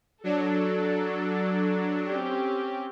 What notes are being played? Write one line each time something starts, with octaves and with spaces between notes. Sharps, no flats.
F#3 D4 A4
C4 C#4 G4